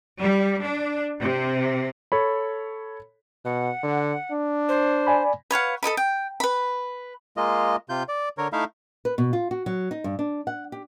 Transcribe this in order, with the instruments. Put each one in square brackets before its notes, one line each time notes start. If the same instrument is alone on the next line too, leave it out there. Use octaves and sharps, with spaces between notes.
[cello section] G3
D4
C3
[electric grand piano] A4 C#5 B5
[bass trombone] B2 [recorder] F#5
[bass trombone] D3
D4
[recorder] C5
[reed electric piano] D5 G#5 B5
[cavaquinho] B4 C#5 F5 F#5
A4 A#4 D#5 B5
G5
B4 B5
[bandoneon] G#3 A#3 F4 D#5
C3 F4 G6
D5
D3 A#4 C#5
A3 D#4 E4 E5 F5
[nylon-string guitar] B4
B2
F4
F#4
F#3
D#4
G2
D4
F#5
G4